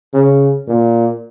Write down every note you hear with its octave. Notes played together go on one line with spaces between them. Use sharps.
C#3
A#2